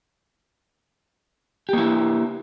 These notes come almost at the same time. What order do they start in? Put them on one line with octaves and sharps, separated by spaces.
G4 A#3 E4